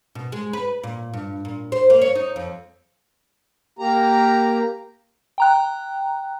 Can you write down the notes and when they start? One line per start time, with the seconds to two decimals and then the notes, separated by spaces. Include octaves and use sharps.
0.15 B2
0.32 G#3
0.53 B4
0.83 A#2
1.13 G2
1.45 A#2
1.72 C5
1.90 A#3
2.01 C#5
2.15 D#4
2.36 F2
3.79 A#3 G4 A#5
5.38 G5 A#5 F#6